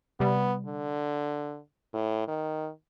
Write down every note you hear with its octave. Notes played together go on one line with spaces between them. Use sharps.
C3 G3 B3
D3
A2
D#3